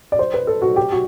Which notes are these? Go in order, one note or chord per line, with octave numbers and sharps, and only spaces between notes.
D5
C5
B4
A4
F#4
G4
F#4